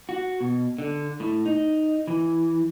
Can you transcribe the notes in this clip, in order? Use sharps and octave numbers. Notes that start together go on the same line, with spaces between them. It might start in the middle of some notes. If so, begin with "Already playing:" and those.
F#4
B2
D3
A2
D#4
E3